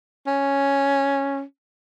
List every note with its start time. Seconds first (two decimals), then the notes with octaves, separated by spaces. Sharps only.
0.27 C#4